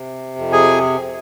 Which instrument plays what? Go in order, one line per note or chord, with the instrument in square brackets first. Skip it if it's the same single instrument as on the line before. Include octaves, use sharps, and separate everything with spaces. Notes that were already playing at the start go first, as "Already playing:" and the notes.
Already playing: [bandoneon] C3
F2
G#4 G#5